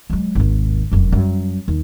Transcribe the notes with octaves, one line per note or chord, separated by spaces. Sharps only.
F#3 G#3
G#1 D#2
F1 F#2
F#2 G3
D#2